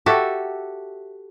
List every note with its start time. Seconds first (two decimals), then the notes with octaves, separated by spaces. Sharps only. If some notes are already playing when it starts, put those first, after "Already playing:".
0.06 F#4 G4 A4 E5